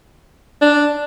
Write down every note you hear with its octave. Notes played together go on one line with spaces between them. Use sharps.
D4